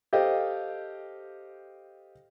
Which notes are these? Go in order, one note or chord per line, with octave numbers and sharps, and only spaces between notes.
G4 A4 C5 D#5 F5 G5